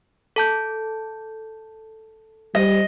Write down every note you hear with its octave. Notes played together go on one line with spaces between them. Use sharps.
A4 A5 G6
G3 D#5